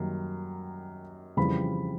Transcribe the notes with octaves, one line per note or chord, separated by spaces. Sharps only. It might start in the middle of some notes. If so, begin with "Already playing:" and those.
Already playing: F#2 D#3 G3 A#3
F2 C#3 E3 G3 B5